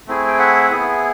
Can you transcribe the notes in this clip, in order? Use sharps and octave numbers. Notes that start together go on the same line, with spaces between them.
A3 C4 E4 G#4
G5
E5 F#5
B3 E4 G#4